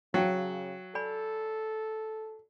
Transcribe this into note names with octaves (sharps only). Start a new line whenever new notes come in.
C#3 F#3 F5 G5 A5
A4 D5 G#5 B5